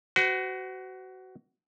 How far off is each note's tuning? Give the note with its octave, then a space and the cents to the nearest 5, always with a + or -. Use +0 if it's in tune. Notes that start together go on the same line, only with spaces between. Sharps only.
F#4 +20 C5 -40